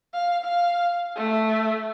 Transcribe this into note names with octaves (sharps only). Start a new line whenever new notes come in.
F5
F5
A3